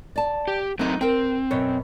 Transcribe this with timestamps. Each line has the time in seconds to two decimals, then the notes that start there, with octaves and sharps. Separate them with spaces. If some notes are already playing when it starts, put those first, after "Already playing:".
0.16 D5 A5
0.48 G4
0.79 F#3 A3 C4 D#4 A#4
1.01 C4 A#4 G5
1.51 F#2 B2 C#5